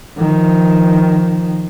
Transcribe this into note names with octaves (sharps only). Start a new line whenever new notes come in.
D#3 F3